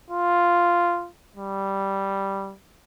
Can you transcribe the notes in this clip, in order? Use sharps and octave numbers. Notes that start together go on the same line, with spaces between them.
F4
G3